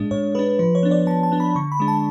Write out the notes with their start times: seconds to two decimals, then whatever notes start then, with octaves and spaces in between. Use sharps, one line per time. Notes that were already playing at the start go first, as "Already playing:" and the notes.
Already playing: A2 G#3 D4
0.11 A2 C#5
0.35 G#3 D4 B4
0.59 F3 B4
0.75 C#5
0.83 B3 D4
0.91 D5
1.07 F3 A5
1.23 A5
1.32 B3 D4
1.40 B5
1.56 D3 C#6
1.72 B5
1.80 G#3 D4
1.88 A5